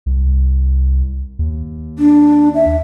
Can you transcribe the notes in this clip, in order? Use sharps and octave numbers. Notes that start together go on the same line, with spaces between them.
C2
D#2
D4
E5